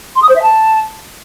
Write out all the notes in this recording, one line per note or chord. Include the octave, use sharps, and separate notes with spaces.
C6
D#6
C5
E5
A5